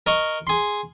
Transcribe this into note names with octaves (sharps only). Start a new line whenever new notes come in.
A#4 D#5 A#5 C#6
G#4 C6